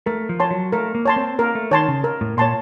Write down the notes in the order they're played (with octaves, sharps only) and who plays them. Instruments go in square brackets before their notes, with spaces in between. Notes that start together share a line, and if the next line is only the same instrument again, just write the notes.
[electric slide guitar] A3 [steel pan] A#4
[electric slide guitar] F3
[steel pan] C#5 A5 C6
[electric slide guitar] F#3
[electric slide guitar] A3 [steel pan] A#4
[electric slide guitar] A#3
[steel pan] C#5 A5 C6
[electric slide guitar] C4
[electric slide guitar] A#3 [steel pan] A#4
[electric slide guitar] A3
[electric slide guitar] D#3 [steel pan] C#5 A5 C6
[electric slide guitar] C#3
[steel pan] A#4
[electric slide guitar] A2
[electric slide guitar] A#2 [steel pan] C#5 A5 C6